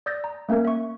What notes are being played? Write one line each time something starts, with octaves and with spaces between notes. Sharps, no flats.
D5 D#6 E6 G6 A6 A#6
A#5
A3 A#3 C#4 A#4 G#6
E5 C#6